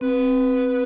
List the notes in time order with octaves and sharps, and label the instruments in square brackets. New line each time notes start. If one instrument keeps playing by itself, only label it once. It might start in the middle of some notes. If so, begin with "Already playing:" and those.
[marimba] C4 [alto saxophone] B4